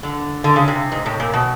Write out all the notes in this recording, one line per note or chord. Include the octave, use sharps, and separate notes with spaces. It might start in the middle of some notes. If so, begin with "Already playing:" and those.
D3
D3
C#3
C3
G#2
A2
A#2
B2